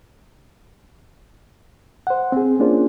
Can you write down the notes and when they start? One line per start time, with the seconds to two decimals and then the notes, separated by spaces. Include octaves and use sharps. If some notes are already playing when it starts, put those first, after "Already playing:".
2.07 C5 F#5
2.32 C4 G#4
2.59 A#3 C#4 D4 F4 G#4 C5